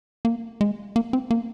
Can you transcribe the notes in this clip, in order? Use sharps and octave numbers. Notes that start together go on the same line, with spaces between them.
A#3
G#3
A#3
C4
A#3